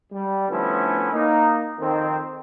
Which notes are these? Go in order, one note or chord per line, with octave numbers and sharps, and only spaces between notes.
G3
D3 F3 A3 B3 C#4 E4
A#3 D#4
F2 D#3 C4